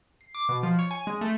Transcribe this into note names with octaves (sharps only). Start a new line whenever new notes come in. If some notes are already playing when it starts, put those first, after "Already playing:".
C7
D6
B2
F3
C#5
G#5
G#3
A3